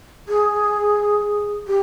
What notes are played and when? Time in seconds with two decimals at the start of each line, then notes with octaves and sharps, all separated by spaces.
0.28 G#4
1.68 G4